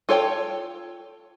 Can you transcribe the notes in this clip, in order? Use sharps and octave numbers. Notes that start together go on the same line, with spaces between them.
F4 A4 C#5 G5